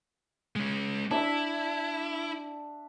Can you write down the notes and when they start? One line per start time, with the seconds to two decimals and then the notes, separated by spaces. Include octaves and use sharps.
0.56 G#3 C#4
1.11 D4 E4 E5 E6